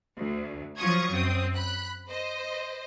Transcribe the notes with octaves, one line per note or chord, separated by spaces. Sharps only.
D2
F3 F#3 F4 C#6 D#6 G#6
F#2 C4 D#6
B5 F#6
C5 D#5